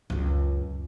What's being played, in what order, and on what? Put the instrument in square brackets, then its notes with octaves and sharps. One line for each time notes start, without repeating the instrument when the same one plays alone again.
[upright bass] C#2 F#2